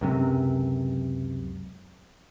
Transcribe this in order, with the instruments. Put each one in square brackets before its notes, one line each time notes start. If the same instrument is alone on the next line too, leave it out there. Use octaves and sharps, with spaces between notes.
[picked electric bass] C#2 F#2 C3